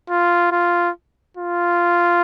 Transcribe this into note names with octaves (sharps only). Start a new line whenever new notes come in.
F4
F4
F4